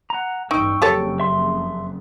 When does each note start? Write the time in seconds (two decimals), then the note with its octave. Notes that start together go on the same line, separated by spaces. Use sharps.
0.10 F#5 A#5
0.51 A1 G2 D#4 G5 C#6 E6
0.82 F#1 F2 G4 A4 C#5
1.20 E5 C6